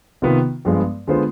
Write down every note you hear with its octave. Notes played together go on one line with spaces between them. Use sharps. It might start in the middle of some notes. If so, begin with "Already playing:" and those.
C3 D#3 B3 F4 B4
G2 F3 G#3 B3
D3 G#3 B3 F4 C5